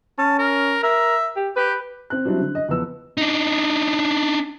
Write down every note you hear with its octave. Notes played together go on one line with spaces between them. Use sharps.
C#4 A5
A#4
A#4 E5
G4
G4 B4
C4 F#6
F#3 G3 C4 D4 E4
D3
D#5
E2 F3 B3 E6
D4 D#4